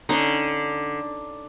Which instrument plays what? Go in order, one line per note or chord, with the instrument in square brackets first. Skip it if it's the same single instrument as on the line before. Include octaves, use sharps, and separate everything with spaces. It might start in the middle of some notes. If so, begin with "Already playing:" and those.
[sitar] D3 [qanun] C#4 D#4